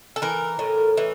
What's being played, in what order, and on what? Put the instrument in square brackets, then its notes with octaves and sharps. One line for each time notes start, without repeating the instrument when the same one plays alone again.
[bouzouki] A4
E3 A#4
A2
E3